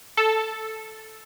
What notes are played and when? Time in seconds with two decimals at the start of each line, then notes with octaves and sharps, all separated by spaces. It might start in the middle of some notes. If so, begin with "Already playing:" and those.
0.17 A4